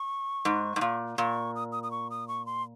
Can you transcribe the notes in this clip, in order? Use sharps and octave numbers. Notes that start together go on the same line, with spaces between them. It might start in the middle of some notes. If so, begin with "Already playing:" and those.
Already playing: C#6
G#2
G#2
A#2
A#2 C#6
D#6
D#6
D#6
C#6
D#6
C#6
C6